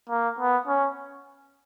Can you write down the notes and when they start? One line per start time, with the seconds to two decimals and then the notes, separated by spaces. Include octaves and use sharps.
0.10 A#3
0.39 B3
0.68 C#4